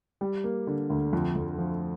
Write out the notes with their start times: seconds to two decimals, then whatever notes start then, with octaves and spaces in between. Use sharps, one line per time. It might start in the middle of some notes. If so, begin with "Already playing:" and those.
0.21 G3
0.44 A#3
0.67 D3
0.90 D2
1.13 F2
1.36 F2
1.58 F3